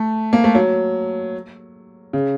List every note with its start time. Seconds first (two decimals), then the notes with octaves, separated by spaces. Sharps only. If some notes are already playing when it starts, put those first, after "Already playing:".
Already playing: A3
0.33 A#3
0.44 A3
0.55 F#3
2.13 C#3